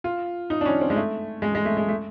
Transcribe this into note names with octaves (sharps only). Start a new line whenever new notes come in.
F4
D#4
D4
C#4
C4
G#3
A3
G#3
G#3
A3
G#3
A3